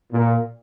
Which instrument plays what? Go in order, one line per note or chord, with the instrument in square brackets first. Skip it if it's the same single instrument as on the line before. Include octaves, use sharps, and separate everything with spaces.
[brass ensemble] A#2